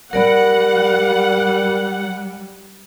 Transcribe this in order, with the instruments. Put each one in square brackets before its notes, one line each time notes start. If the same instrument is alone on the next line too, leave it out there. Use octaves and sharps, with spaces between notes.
[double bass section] G3 [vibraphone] A#4 D5 B5 [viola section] F#5